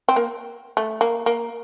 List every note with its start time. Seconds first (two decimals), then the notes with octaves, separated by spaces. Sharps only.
0.09 C4
0.16 A#3
0.77 A3
1.01 A#3
1.26 A#3